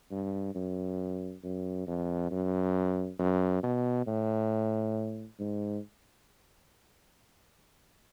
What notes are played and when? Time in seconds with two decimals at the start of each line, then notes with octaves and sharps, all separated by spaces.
0.11 G2
0.55 F#2
1.44 F#2
1.87 F2
2.31 F#2
3.19 F#2
3.63 B2
4.07 A2
5.39 G#2